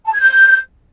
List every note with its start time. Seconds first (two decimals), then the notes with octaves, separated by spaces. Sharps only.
0.06 A5
0.13 G#6
0.20 G6